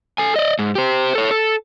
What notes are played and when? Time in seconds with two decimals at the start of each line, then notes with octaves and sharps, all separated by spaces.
0.18 A4 G#5
0.36 D5 D#5
0.59 G#2
0.75 G4 C5
1.15 A4 C#5
1.31 A4